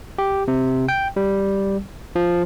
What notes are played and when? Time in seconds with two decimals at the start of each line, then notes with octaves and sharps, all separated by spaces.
0.18 G4
0.48 C3
0.89 G5
1.16 G3
2.16 F3